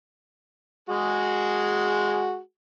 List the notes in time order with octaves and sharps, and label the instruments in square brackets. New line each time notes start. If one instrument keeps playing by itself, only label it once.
[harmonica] G#3 F#4 G#4